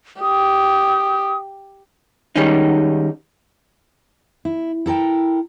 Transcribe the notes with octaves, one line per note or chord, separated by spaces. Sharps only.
G4 D#6
D#3 G3 G#3 C#4 D#4
E4
E4 A4 A#4 G5